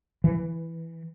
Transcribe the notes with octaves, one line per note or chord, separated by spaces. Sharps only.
E3